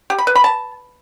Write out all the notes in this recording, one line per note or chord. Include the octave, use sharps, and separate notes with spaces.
G4
B5
B4
B5
A5